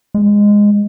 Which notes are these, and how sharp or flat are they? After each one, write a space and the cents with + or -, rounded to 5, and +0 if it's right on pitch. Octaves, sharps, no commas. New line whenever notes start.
G#3 -10